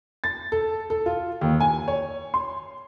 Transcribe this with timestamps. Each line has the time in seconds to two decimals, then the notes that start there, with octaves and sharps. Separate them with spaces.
0.24 A6
0.52 A4
0.90 A4
1.06 F4
1.41 D#2
1.60 G#5
1.88 C#5
2.34 C6